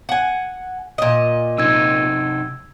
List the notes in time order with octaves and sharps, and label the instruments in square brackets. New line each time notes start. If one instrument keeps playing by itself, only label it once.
[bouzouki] F#5 G#5
A#2 D#5
[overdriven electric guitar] C3 D#4 [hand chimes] E6 G#6